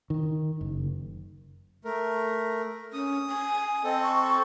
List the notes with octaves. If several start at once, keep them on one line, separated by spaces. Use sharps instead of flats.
D#3
F#1
A3 A#4
C#4 D#6
G#5
C4 A4 D#5
C#6